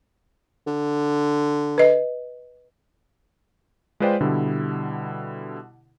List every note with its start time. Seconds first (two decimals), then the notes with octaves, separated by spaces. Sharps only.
0.67 D3
1.78 B4 D#5
4.00 G#3 F4 B4 C5 D5 G5
4.21 B2 D3 G3 E4